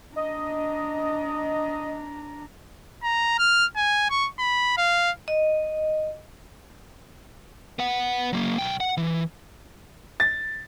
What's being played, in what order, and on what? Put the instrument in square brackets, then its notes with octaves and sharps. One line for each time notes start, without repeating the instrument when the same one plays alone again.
[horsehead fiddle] D4 A#5 [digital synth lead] D#5
[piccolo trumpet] A#5
F6
G#5
C#6
B5
F5
[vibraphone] D#5
[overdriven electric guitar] B3 F#5
F#3 A#3
B1 G5
F#5
E3
[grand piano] A6